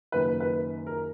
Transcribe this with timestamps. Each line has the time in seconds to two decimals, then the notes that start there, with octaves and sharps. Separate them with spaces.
0.12 F#1 F#2 D#3 B4
0.40 B4
0.86 A#4